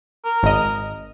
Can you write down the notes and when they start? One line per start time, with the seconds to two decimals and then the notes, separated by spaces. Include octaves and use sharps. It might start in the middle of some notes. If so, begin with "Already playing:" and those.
0.25 A#4
0.43 G#1 D#5